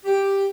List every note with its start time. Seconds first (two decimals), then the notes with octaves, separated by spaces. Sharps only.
0.06 G4